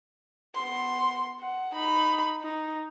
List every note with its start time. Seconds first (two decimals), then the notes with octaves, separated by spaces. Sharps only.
0.55 B3 C6
1.41 F#5
1.74 D#4 B5
2.42 D#4